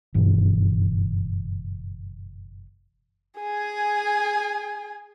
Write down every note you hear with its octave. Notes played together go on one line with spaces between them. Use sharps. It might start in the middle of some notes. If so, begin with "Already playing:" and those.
F#1 G2 B2 E3
G#4 G#5